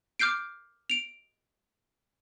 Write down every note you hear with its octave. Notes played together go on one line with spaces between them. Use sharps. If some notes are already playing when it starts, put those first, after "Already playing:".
D6 F6 G6 C7 D7
D7 F7